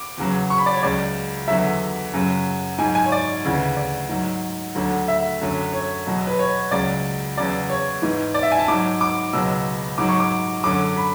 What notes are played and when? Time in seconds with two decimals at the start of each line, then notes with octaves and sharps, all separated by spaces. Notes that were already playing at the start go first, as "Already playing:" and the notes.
Already playing: D6
0.18 E2 C#3 F#3
0.50 C#6
0.58 B5
0.66 D5
0.74 C#5
0.83 C#2 C#3 F#3 D5
1.48 E2 D3 F#3 E5
2.13 F#2 C#3 F#3
2.78 G#2 F#3 G#5
2.95 G#5
3.06 C#5
3.12 D5
3.45 D2 C#3 E3
3.77 D5
4.09 G#2 F#3
4.75 D2 D3 F#3
5.08 E5
5.41 F#2 D3 F#3
5.73 C#5
6.06 E2 B2 F#3
6.27 B4
6.39 C#5
6.71 C#2 C#3 F#3 D5
7.37 E2 C#3 F#3 D5
7.70 C#5
8.02 G#2 E3
8.34 D5
8.43 E5
8.52 G#5
8.59 A5
8.68 G#2 F#3 D6
9.01 D6
9.33 C#2 B2 F#3 E6
9.98 G#2 F#3 D6
10.09 C#6
10.20 D6
10.64 F#2 D3 F#3 D6
10.97 B5